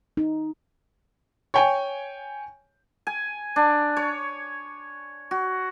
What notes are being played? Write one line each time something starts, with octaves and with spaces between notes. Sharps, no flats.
D#4
C#5 G5 G#5
G#5
D4
C#5
F#4